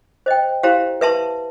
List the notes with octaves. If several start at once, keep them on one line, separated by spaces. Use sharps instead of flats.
C5 D#5 G5
E4 G4 C5 F5 A#5
B4 E5 A5 C6